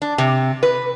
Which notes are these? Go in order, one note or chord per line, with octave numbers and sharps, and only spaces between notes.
D4
C3
B4